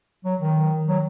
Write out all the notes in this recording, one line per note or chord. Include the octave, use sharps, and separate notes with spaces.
F#3
D#3
F#3